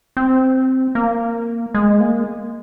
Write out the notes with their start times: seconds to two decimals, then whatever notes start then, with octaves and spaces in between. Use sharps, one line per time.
0.17 C4
0.95 A#3
1.74 G#3
2.00 A#3